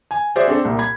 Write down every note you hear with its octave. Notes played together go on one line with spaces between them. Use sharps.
G#5
F#4 G#4 C5 D5 E5
C4 D4 A4
C2 A#2
B5 G#6